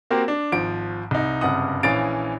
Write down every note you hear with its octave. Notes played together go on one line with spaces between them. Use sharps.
A#3 C4 F#4 G4 A#4
D4
G#1 F3 D7
C2 D#4
F#1 G2 C3 F#5 D#6
A#1 E3 C#4 F5 A6 D7